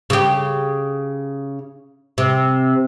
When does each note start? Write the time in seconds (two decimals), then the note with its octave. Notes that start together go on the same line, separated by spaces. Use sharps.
0.10 C#3 G4
2.18 C3